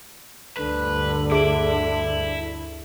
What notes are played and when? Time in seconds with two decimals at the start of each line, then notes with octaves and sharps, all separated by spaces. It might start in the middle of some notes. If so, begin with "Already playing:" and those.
0.57 D2 G2 D3 B4
1.32 E4 G#4 D7